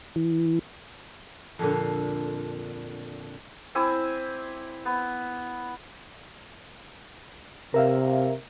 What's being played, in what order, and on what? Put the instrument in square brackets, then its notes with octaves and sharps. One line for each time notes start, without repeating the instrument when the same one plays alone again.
[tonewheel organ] E3
[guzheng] F2 A#2 D3
[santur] C4 E4 G#5 D6
B3
[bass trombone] C3 [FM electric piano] A#4 E5 F5